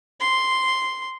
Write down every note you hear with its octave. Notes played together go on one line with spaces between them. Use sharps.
C6